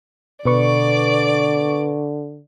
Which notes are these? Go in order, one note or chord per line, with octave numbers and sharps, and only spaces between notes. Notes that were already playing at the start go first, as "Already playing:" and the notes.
B2 D3 B4 D5 C#6 D6